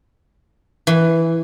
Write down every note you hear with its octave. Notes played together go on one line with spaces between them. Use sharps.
E3